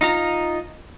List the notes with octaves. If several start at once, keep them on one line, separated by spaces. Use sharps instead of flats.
D#4 F4 A#5